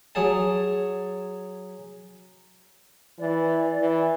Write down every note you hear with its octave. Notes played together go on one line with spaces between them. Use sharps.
F#3 G#4 A5
E3 D5
E3